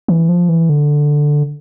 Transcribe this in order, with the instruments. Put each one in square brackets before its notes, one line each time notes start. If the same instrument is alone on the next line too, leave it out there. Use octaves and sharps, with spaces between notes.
[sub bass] E3
F3
E3
D3